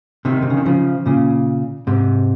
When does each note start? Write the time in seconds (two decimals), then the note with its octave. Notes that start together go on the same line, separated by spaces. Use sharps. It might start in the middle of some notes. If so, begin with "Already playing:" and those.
0.25 C3 D#3
0.42 C3
0.50 C#3
0.57 D#3
0.65 C#3 F3
1.06 A#2 C#3
1.87 G#2 C3